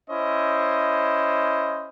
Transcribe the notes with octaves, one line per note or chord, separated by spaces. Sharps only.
C#4 E4 C5 D#5